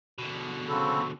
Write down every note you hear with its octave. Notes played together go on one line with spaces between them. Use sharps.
B2 D3
C#3 C4 F#4 A4 B5